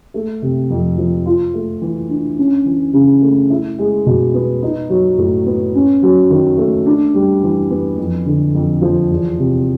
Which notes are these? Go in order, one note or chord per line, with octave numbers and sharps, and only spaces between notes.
A3
C3
F2
F3
F4
A3
E3
D4
C#4
E3
C#3
A3
E4
G#3
B2
B3
D#4
F#3
A2
B3
C#4
F#3
D#3
A3
D4
G3
E3
B3
F2
D3
F2
F3
E2
C3